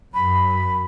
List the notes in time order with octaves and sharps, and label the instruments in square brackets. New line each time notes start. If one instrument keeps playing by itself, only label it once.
[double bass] F#2 [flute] B5